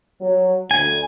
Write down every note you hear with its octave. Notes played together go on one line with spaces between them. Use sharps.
F#3
D2 G#5